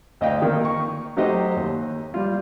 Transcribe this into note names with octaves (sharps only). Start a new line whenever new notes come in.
D2 D#5 F5 G5
D#3 A#3
C#6
F#3 A3 D#4 G4 C5 D#5
D#2
G3 F4